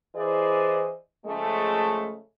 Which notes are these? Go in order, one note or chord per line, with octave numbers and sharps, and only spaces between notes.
E3 E4 G#4 C5 D5 D#5
C#3 F3 G#3 A3